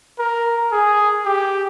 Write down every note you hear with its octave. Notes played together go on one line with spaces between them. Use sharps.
A#4
G#4
G4